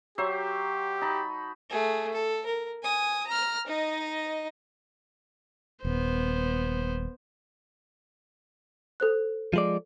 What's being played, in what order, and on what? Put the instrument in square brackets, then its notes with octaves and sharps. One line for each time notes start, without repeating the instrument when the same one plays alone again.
[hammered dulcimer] F#3 C5 E5 [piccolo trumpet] G4
[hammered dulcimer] D#4 A5 B5
[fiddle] A3 G#4
A4
A#4
G#5 D#6
A#5 F6
D#4 D#5
[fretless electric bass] D#1 [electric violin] B3 C5
[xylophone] A4 C5 F#6
[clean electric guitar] F3 G#3 D5